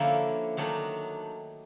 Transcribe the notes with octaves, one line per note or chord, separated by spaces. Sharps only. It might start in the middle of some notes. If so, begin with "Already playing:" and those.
Already playing: D3 F3 A#3 C#4 E4
D#3 F#3 A3 D4